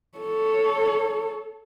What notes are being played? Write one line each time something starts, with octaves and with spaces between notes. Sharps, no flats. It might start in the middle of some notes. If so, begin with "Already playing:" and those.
A4 C#5